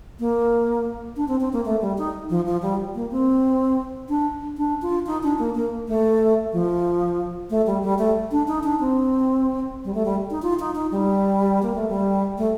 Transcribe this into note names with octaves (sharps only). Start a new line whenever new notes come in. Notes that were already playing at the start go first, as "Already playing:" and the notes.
A#3
D4
C4
C4
A#3
A3
G3
D#4
F3
F3
G3
A#3
C4
D4
D4
F4
D#4
D4
A#3
A#3
A3
F3
A3
G3
G3
A3
D4
D#4
D4
C4
G3
A3
G3
D#4
F4
D#4
D#4
G3
A#3
A3
G3
A3